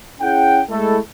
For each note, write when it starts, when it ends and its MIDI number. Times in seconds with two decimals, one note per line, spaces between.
0.21 0.62 61
0.21 0.62 64
0.21 0.62 68
0.21 0.62 78
0.21 0.62 79
0.70 0.98 56
0.70 0.98 57
0.70 0.98 64
0.70 0.98 69